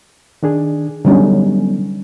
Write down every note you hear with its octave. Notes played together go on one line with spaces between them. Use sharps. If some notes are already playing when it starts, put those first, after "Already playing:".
D#3 D4 G#4
D3 F#3 G3 B3 C#4 D#4